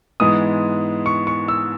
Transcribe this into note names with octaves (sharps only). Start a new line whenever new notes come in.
G#2 E3 G#3 B3 D#6
C#6
C#6
E6